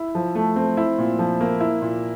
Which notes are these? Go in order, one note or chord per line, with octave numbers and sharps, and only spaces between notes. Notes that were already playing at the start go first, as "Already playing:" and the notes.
Already playing: E4
F3
A3
C4
E4
A#2
F3
A#3
E4
A#2